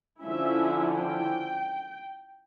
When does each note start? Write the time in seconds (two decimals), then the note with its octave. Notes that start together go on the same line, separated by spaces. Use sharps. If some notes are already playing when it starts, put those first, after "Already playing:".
0.22 D3 F3 C#4 E4 E5
0.94 G5